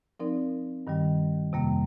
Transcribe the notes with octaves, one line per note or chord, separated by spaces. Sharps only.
F3 C4 D#4 A#4 D5
G2 D#3 G3
F2 C3 G3 A#3